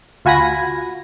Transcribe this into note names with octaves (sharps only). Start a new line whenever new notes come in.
D2 F4 F#4 G#5 B5 A#6